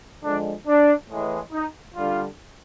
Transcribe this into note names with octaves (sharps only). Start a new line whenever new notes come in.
D3 F3 G#3 D4
D4
A2 E3 G#3
D#4
D3 G3 F4